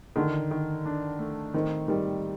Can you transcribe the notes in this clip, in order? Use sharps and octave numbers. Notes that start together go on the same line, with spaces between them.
D3 D#3
D#3
D4
A3
D#3 C4
D#3 G3